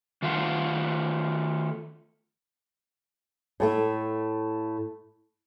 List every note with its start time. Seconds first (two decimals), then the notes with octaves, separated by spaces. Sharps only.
0.22 D#3 A3 F4 F5 F#5
3.60 A2 A3 E5